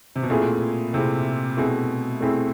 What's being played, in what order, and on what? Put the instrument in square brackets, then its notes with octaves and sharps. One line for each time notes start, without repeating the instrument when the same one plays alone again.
[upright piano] C3
B2
[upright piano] A#2 [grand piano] A3 C4 E4 G#4
[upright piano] C3 [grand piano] A3 C4 E4 G#4
[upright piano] B2 [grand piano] A3 C4 E4 G#4
[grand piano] A3 C4 E4 G#4